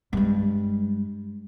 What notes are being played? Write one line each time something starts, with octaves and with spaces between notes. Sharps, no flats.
G2 G#3